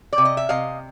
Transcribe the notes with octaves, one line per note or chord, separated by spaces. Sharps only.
D5
C3
D#5
E5
C3 D#5 F5